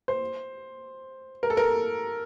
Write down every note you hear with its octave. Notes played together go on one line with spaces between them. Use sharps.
C5
A#4
A4
A#4